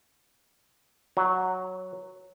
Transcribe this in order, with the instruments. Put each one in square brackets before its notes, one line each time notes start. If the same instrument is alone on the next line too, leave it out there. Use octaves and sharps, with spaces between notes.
[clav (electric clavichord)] F#3